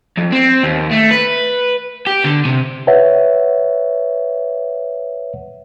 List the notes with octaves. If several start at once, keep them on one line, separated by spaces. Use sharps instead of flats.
F2
C4
D#2
A3
B4
G4
D3
C3
B4 C#5 E5 F#5